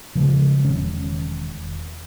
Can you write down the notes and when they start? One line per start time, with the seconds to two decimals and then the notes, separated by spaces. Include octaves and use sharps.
0.15 C#3 F3 G3 G#3
0.65 E1 D#3 C#4